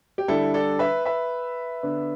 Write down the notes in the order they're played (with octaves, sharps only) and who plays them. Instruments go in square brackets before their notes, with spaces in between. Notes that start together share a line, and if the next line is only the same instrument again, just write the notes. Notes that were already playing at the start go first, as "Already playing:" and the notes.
[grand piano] G4
D3 G3 D4 E4 A4
A4 D5
B4 E5
B4 E5
D3 B3 D4